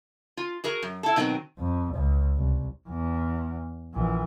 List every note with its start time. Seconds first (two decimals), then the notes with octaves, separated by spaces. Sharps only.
0.37 F4
0.64 F#4 G#4 A#4
0.82 F#2
1.03 E4 A4
1.16 B2 D#3 F#3 A3 C4
1.58 F2
1.95 C#2
2.37 C2
2.89 E2
3.94 A#1 E3